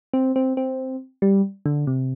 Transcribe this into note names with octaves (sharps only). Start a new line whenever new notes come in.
C4
C4
C4
G3
D3
C3